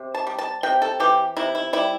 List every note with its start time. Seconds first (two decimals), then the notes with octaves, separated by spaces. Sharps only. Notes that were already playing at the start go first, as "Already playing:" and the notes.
Already playing: C3
0.14 A5
0.27 G3
0.38 A5
0.63 C3 G5
0.82 A4
1.00 E3 G4
1.37 C3 E4
1.55 E4
1.73 G3 E4